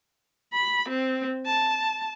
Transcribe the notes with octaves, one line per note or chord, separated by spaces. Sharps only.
B5
C4
A5